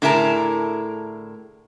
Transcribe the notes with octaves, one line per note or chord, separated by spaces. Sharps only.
A2 D3 E4 G#4 A#4 A5